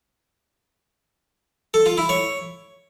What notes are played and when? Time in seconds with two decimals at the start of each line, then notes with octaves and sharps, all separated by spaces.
1.74 A4
1.86 F4
1.98 E4
2.09 C#5